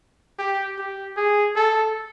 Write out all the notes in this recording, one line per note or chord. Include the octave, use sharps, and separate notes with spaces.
G4
G4
G#4
A4